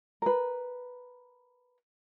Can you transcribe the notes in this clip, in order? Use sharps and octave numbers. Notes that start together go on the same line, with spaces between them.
A#4 B4